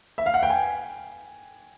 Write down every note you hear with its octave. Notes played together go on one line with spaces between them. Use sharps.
E5
F5
F#5
G5
G#5